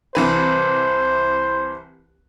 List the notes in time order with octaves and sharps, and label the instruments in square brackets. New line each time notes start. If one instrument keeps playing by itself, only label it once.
[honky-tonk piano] C2 E3 B4 [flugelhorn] C5